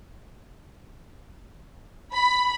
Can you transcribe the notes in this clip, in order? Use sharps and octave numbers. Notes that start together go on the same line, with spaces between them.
B5